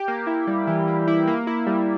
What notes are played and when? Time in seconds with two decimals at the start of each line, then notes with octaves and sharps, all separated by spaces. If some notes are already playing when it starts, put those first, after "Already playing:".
Already playing: G4
0.08 A#3
0.27 E4
0.47 G3
0.67 E3
0.87 A#3
1.08 E4
1.27 A#3
1.47 E4
1.67 G3